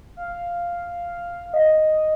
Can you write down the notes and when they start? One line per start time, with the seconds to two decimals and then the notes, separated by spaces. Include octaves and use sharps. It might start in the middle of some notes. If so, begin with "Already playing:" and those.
0.17 F5
1.54 D#5